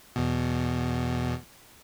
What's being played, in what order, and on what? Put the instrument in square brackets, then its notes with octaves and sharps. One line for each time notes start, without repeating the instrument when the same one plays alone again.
[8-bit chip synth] E2 B2